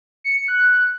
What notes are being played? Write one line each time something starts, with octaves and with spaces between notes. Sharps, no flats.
C#7
F#6